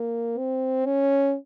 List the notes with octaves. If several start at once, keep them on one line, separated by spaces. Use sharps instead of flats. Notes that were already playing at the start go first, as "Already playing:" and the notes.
Already playing: A#3
C4
C#4